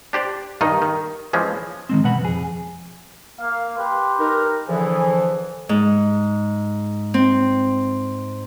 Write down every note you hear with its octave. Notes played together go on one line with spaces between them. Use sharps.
D4 G4 C5 D5
G2 D#3 D#4 D#5
D#3
E3 F3 G#3 C#4
D#3 G#3 C4
B2 B4 F#5 B5
F2 G#4
A#3 F5
G4 B4 C6
D#4 A#4
D3 E3 F3 E4 G#4
G#2
C4